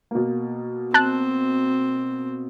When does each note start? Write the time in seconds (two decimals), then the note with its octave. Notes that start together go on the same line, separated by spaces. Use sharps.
0.11 B2 A#3
0.94 C4 A5 F#6